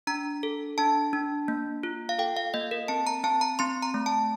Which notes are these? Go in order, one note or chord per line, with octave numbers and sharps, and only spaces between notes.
D4 A#5
A4
D4 A5
D4
A#3
F4
F5
A4 G5
F5
A#3 D#5
A#4
C4 A5
A#5
C4 A5
A#5
C4 C6
A#5
A3
A5